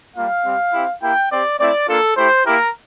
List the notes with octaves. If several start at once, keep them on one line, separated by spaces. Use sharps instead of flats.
G3 A#3 F4 F5
G3 C4 G4
C4 E4 G4
A#3 E4 G4 G5
C4 G4 D5
A3 C4 E4 D5
A#3 D4 F4 A4
A3 E4 G4 C5
A#3 E4 G4 A#4